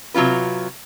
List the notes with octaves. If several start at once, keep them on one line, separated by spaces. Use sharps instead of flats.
C3 F#3 C#4 F4 B4